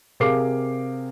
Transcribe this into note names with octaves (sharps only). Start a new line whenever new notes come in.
C3 G#4 A#4 F5 D6 C7